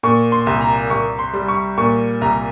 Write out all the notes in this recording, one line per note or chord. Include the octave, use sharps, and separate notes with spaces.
A#2 C#6
C6
C2
A#5
C2 C#6
C6
G3
C#6
A#2 C#6
C2 A#5